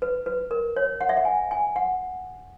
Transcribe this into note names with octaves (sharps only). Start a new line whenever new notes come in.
B4
B4
A#4
C#5
F#5
E5
F#5
G#5
G#5
F#5